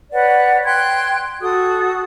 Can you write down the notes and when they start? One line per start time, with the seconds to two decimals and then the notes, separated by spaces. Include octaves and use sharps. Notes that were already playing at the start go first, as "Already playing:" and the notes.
0.12 B4 C#5 D5 F#5
0.65 G5 C6 F#6 G#6
1.42 F#4 A4 D#6